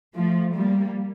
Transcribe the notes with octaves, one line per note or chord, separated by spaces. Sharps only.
F3 A3
G3 A#3